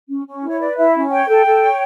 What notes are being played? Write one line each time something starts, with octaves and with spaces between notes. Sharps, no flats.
C#4
C#4
E4
C#5
B4 D5
E4 E5
C#4
C#5 G5
A4
A4
C#5